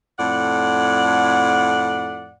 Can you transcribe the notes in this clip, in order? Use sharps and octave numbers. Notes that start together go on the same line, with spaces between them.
F2 A2 D5 F#5